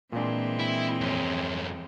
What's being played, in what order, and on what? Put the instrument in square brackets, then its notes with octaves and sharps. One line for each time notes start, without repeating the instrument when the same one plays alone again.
[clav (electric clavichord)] A#2 D4 [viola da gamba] E3 G#3 C4
[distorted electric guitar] E4
F2 C#4